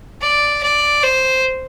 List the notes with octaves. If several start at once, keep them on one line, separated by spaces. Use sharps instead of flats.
D5
D5
C5